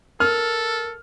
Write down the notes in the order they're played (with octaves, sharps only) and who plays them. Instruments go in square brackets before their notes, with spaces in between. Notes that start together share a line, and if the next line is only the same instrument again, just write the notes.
[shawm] A4 [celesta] A#4 [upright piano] F6